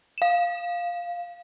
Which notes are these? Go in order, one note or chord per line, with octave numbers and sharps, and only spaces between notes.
F5 E7